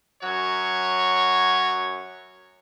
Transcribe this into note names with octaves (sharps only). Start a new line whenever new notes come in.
F#2 F#3 C#5